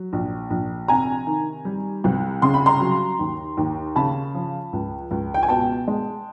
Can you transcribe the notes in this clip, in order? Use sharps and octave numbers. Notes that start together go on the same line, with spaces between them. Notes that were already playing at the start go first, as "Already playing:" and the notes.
Already playing: F#3
A#1
A#1
C3 G#5 A#5
D#3
G3
C2
C#3 C6
B5
A#5 C6
F#3
D#2
D#2
C#3 A5 B5
F3
C#2
C#2
G5
G#5
B2 G5 A5
G#3